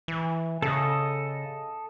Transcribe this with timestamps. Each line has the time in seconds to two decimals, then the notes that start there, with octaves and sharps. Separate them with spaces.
0.08 E3
0.62 C#3 A4 D#5